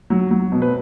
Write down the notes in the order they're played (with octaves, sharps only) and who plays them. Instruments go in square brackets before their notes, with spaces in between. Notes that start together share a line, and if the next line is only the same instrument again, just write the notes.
[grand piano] F#3
F#3
B2
B4